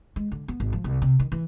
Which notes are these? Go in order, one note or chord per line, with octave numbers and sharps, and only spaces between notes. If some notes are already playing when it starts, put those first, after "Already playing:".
G#3
D3
B3
G#1
F3
C2
C3
D#3
E3